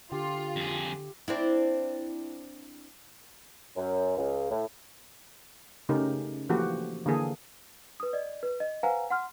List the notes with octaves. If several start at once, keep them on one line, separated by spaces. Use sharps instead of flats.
D3 F4 G4
F2 G#4
C4 D4 E4
F#2
C#2
A2
C#3 A3 C#4 D#4 G4 A#4
E3 F3 A3 A#3 F#4 G4
D3 E3 A#3 G#4 A4
B4 D#6
D5 D#5
B4
D#5
B4 C5 F5 F#5 G#5 A#5
F#5 C6 F6